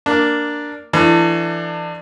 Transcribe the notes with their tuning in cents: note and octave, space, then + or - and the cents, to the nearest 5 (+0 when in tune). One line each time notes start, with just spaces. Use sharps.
A#3 +0 D4 +0
E3 +35 A3 +35 D4 +30